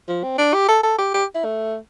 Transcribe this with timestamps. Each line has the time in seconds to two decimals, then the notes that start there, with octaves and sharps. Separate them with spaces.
0.09 F3
0.23 C4
0.38 D4
0.54 G4
0.68 A4
0.83 A4
0.99 G4
1.14 G4
1.35 E4
1.45 A3